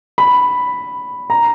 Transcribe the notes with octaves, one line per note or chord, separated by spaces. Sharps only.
B5
A#5